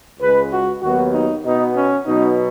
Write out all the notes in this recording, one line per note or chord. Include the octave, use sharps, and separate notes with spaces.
C#2 C#3 G#3 B4
F#4
D#2 D#3 F#3 B3 F#4
D#4
B2 B3 D#4
C#4
B2 F#3 B3 D#4